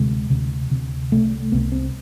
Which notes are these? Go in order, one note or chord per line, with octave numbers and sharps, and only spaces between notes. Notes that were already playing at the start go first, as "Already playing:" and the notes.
Already playing: D2 C3 G#3
D2 C3
D2 C3
C2 C3 A3
C2 C3 B3
C4